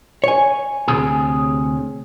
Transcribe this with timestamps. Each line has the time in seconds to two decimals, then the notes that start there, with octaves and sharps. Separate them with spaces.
0.24 C#5 G#5
0.88 D2 C3 G#4